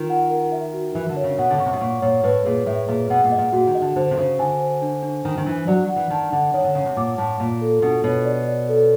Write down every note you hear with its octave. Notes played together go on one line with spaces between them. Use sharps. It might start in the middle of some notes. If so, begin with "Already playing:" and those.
Already playing: D#3 F4 A#4
F#5
A#4
E5
F#4
E3 E5
D3
C#5
C#3
B2 F#5
D3
C#3 C#6
C3
B2
A#2 C#6
A#2 C#5
A2 B4
A#2 G#4
A2 E5
A#2 G#4
B2 F#5
A#2
D#5
A#2
A#2 F#4
D#3
D#5
D3
D3 C5
C3
C#3 C5
D3 G#5
C5
D4
D4
D#3 D4
D#3
E3 D4
F#3 D5
F#5
E3
D#3 A5
D3 F#5
D#3 C#5
D3
C#3 C#5
C3
A#2 D6
A2 A5
A#2 F4
A4
B2 D4
B2 C#5
D5
D5
A4